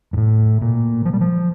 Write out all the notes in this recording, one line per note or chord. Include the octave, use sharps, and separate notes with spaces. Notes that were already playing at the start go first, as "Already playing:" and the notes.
G2
A2
A#2
F3
G3
F3